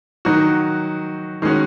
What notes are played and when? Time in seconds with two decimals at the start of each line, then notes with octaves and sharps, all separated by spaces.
0.25 D#3 F#3 D#4 F#4
1.42 D#3 G#3 C#4 F#4